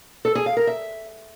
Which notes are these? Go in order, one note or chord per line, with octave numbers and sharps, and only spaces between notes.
A4
G#4
F5
A#4
E5